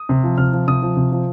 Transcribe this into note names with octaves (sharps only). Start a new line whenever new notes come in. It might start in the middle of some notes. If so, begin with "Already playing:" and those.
Already playing: D#6
C3
F3
C3 F6
F3
C3 D#6
F3
C3
F3